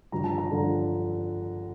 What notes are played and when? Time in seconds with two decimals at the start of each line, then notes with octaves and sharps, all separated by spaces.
0.12 G2 D3 F3 A#5
0.24 A5
0.38 A#5
0.50 G2 D3 F3